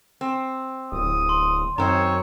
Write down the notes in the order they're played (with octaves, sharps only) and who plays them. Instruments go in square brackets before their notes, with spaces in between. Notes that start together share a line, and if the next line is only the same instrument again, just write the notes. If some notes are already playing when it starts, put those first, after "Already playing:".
[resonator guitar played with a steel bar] C4
[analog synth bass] D1 [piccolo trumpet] D#6
[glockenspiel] C6
[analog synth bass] F#2 [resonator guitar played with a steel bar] D#3 C4 [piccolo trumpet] C#5 [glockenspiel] A#5